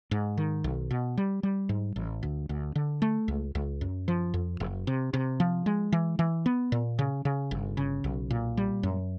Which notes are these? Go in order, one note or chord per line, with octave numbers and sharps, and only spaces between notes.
G#2
D#3
B1
B2
G3
G3
G#2
A1
D2
D2
D3
A3
C#2
C#2
F#2
F3
F2
F#1
C3
C3
F3
G#3
E3
E3
B3
A#2
C#3
C#3
G1
C#3
B1
A#2
G3
F#2